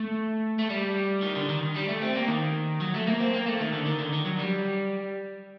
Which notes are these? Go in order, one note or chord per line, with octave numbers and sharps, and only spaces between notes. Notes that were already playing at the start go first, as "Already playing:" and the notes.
Already playing: A3
A3
G3
D#3
D3
D#3
G3
A3
C4
A#3
D#3
F#3
A3
A#3
C4
A#3
A3
D#3
D3
D#3
D3
D#3
F#3
G3